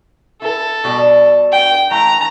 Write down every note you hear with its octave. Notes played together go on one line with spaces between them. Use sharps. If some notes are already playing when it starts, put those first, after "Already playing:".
E4 A4
B2 G3 D5
G5
E3 A3 A#5